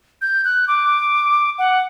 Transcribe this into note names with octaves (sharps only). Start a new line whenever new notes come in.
G6
F#6
D6
F#5